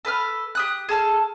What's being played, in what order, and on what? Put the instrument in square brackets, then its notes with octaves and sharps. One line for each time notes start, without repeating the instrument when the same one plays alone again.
[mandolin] A4 B4 D#6 F6
G4 D#6 F#6
G#4 A4 A5 F6